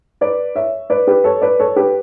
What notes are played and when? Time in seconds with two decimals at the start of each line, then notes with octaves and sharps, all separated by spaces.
0.21 B4 D5
0.55 C#5 E5
0.90 B4 D5
1.07 G4 B4
1.24 A4 C#5
1.42 B4 D5
1.60 A4 C#5
1.76 G4 B4